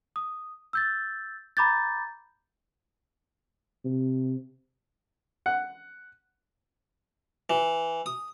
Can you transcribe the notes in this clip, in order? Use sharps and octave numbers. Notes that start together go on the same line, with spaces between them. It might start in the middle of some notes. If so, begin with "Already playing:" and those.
D#6
E6 G6 A6
A#5 B5 D6 G6 A6
C3
F#5
E3
D#6